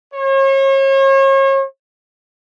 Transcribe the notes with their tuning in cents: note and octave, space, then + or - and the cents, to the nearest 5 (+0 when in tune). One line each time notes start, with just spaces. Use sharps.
C#5 -40